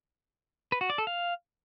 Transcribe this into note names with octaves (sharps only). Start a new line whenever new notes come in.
B4
F#4
D5
A4
F5